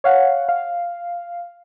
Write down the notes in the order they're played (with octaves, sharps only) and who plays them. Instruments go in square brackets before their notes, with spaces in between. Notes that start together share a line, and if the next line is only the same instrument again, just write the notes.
[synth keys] C#5 F5 F#5
F5